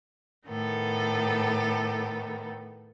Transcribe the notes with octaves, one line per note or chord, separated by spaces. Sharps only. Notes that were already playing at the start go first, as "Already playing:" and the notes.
A2 D#3 B3 A4